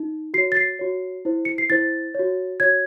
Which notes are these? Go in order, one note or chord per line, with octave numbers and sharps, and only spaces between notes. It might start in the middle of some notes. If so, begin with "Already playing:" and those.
Already playing: D#4
F#4 C#5 C7
A6
C7
F#4 C#5
E4 C5
C#7
C7
E4 C5 A6
F#4 C#5
F#4 C#5 G#6